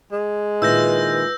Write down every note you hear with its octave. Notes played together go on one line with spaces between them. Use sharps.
G#3
A#2 D#3 E4 B4 E6 G6 A#6